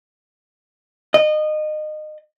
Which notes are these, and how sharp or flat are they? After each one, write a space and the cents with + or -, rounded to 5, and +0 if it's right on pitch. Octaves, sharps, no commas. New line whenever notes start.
D#5 -25